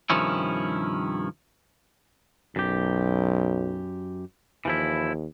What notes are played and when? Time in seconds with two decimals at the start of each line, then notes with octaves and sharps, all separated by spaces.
0.10 G2 C3 D#3 F3 C#4 E4
2.56 B1 F#2 G4
4.65 D#2 E3 F3 E4